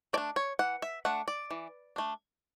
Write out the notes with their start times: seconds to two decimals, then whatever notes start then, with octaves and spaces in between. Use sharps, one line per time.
0.13 A3 D5
0.18 D4
0.36 C#5
0.59 E3 F#5
0.82 E5
1.05 A3 D4 F#5
1.28 D5
1.51 E3
1.96 A3 D4